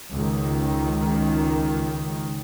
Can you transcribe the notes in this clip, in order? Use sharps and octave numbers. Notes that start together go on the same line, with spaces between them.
C#2 D#3